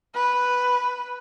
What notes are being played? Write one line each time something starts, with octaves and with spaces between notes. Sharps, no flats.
B4